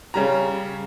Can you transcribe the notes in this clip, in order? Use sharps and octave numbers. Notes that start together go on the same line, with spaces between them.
C#3 G3 A#5